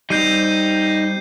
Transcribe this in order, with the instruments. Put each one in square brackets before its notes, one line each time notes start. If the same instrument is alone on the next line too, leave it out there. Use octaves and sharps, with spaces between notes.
[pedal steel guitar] G3 C4 [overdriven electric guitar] D#4 [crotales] G6 C7 D#7